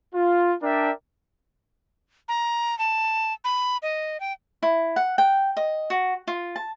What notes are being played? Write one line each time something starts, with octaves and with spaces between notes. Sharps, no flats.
F4
D4 A#4 D5 E5 G5 A5
A#5
A5
B5
D#5
G5
E4
F#5
G5
D#5
F#4
F4
A5